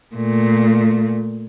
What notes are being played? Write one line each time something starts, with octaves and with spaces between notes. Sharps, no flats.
A#2 A3